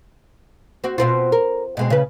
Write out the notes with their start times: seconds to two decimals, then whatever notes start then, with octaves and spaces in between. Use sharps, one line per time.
0.84 C4 F#4
0.98 B2 C4 F4
1.32 A#4
1.77 B2 G#3 C4
1.90 C#3 B4